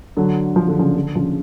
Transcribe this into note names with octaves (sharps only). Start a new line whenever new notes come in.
D3 F#3
F3
D3
C#3 F3
D3
C#3 F3